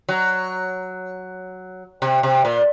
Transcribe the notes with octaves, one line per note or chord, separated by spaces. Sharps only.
F#3
C3
C3
A#2